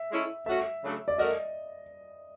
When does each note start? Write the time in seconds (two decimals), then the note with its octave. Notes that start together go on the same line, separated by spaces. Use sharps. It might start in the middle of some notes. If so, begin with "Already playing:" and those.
Already playing: E5
0.10 G#3 C#4 E4 A4
0.46 A3 C#4 F#4 E5
0.82 C#3 F#3 A3 D4
1.08 D5
1.18 A3 C#4 F#4 A#4 D#5